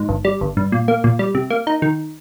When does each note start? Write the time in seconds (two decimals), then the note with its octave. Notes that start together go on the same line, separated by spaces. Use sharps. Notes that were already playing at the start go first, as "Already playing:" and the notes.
Already playing: G#2
0.09 G1
0.25 G3
0.41 G1
0.57 G2
0.72 A#2
0.88 A#3
1.04 A#2
1.19 G3
1.35 C3
1.50 A#3
1.67 D#4
1.82 D#3